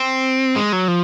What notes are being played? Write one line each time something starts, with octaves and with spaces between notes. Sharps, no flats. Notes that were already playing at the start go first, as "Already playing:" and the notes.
Already playing: C4
G#3
F#3
F3